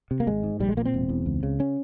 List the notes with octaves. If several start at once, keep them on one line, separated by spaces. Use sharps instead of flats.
C3
A#3
G#1 G#3
G#2
A#1 G3
G#3
A#2 A#3
C4
E1
E2
C#2
C#3
C#4